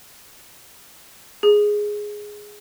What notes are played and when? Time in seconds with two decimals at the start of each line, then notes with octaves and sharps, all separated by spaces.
1.43 G#4